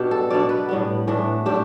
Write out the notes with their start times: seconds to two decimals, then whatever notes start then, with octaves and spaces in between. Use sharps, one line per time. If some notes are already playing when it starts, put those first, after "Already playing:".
Already playing: B2 B3 D4 G4
0.11 A4
0.30 B2 B3 D4 D5
0.49 B4
0.69 A2 G3 B3
1.07 A2 E3 A3 D4
1.46 A2 A3 D4 G4